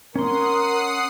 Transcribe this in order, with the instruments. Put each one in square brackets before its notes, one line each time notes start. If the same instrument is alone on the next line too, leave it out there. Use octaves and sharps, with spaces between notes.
[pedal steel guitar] C#4 C6 [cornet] A#4 [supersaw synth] F#5 D#6 C7